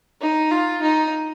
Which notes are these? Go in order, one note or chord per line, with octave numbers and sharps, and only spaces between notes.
D#4
F4
D#4